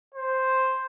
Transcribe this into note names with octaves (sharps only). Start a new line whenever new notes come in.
C5